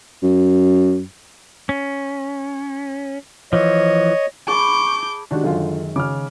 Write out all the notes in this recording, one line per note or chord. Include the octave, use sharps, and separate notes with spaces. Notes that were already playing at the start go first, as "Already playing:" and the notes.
F#2
C#4
E3 F3 C#5 D#5
G#4 A5 B5 C#6 D6 G6
D#3 G#3 C#4 D4 F#4 G4
F#2 D3 F4
C#3 D6 F6